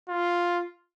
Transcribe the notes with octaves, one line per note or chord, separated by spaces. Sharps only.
F4